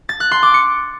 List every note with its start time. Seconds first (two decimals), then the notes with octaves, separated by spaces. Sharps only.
0.09 A6
0.20 F#6
0.31 C6
0.43 D6
0.54 C#7